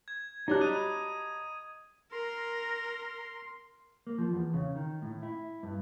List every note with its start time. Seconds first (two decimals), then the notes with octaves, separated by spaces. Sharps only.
0.08 G#6
0.48 F#3 G3 D4 D#4 G4 D5 F#6
0.61 D#5 A#5 B5 D#6 D#7
2.12 A#4 C6
4.07 A#3
4.18 F3
4.32 E2
4.54 C#3
4.76 D#3
5.02 A2
5.23 E4
5.63 G2